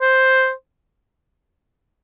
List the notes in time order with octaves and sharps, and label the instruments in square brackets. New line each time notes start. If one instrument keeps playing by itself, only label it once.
[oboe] C5